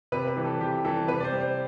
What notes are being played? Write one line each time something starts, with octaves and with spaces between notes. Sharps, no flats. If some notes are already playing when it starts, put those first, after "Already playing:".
C3 B4
B4
E3 G3
A4
C3 G4
E3 G3 A4
C3 B4
D5
C5
G3
C5